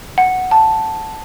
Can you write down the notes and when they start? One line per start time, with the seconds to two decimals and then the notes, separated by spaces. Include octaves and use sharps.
0.18 F#5
0.51 A5